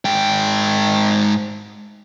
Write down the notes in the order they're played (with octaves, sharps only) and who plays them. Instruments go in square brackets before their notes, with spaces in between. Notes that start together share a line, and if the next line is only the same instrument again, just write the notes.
[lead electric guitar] G#2 G5